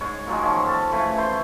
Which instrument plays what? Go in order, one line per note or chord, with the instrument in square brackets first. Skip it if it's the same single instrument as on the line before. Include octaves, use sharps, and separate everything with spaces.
[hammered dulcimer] G#2 C#5
A#2 F#3 G#3
D#3 F3 C#4
A4 A5
C#3 E3 A3
E4 C5 C6